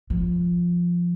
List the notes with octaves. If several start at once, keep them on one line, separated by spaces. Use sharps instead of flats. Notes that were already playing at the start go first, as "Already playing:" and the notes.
F3